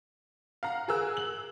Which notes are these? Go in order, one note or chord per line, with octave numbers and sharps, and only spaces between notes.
F5 F#5 A#5
F#4 G#4 A#4 E6 F#6
F#7